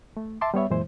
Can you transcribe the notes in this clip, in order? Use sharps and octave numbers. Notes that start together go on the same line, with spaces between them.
A3
E5 A5 C6 D6
G3 B3 C#5 E5
F#2 A#2 E3 G#3 E4 C5